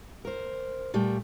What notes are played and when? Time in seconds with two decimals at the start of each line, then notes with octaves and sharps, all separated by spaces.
0.25 A#4 C5
0.94 A#2 G3 A3